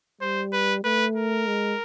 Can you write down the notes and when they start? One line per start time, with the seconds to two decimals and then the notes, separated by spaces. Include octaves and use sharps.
0.21 G3 C5
0.52 B4
0.84 A3 B4
1.16 A#4
1.47 G#3